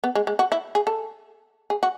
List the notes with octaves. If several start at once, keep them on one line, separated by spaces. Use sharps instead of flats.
B3
G#3
G#3
F#4
E4
G#4
A4
G#4
F#4